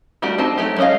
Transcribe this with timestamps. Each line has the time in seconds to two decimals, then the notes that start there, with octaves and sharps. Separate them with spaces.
0.22 G3 A3 D4 F#4 G4
0.38 C4 D#4 A5
0.58 F#3 A3 G4
0.77 G#3 C#4 D#4 D#5 F5